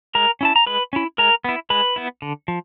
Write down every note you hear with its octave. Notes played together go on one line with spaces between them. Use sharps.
G#3 A#4 A#5
C#4 E4 A5
A#5
G#3 B4 B5
C#4 E4
G#3 A#4 A#5
B3 E4
G#3 B4 B5
B3 E4
D3
F3